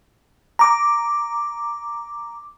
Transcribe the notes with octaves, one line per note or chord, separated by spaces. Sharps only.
A#5 D6